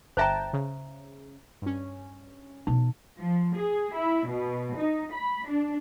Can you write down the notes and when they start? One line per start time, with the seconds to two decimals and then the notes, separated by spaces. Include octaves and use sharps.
0.17 G1 C5 E5 G5 A5 A#5
0.53 C#3
1.62 G2 C#4
2.67 B2 E3 D#4
3.17 F3
3.55 G#4
3.93 E4
4.26 B2
4.76 D#4
5.13 B5
5.45 D4